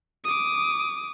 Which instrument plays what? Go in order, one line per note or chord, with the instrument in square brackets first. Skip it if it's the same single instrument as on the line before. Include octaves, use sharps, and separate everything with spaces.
[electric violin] D6 D#6